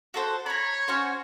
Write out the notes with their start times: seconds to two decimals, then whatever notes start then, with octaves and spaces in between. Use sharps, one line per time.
0.14 F#4 A4 C5
0.46 C#5 A#5 B5
0.88 C#4 F#4 C5